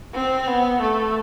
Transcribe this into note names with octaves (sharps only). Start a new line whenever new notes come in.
C4
B3
A3